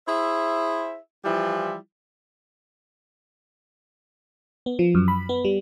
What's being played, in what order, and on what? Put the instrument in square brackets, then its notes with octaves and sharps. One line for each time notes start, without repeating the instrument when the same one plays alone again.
[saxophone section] E4 G#4 C5 E5
E3 F3 G3 E4 F4
[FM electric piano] B3
F3
F#2
B5
B3
G3